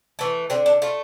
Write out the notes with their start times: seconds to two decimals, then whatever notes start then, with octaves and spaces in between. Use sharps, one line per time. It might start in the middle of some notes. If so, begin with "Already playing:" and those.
0.19 E3 A3
0.50 D3 C4
0.66 D4
0.82 A3 F4